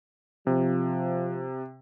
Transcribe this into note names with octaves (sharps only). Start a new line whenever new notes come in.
C3 F3